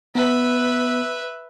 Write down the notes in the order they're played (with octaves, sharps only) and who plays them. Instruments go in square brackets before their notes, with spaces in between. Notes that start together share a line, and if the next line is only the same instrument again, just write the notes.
[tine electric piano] B3 [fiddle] B4 E5